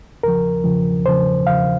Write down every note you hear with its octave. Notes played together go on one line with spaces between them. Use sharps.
E2 C#3 F3 A#4
E2 C#3 F3
E2 C#3 F3 C5
E2 C#3 F3 F5